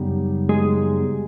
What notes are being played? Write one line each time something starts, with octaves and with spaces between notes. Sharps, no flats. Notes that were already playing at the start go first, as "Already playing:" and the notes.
Already playing: F#2 C#3 F#3 G3 B3 D#4
G#3